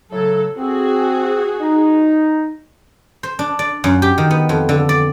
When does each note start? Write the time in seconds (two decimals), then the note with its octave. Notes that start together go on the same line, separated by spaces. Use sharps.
0.11 A2 C#3 F#3 A4
0.57 C4 F#4 G#4
1.61 D#4
3.23 C5
3.39 D4
3.59 D5
3.84 F#2
4.02 G4
4.18 D#3
4.31 B3
4.49 F2
4.69 D3
4.89 D5